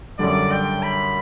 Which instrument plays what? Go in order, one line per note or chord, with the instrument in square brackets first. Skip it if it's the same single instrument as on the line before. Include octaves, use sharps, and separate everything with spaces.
[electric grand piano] F#2 D3 G3 [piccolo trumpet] D5
[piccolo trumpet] G5
B5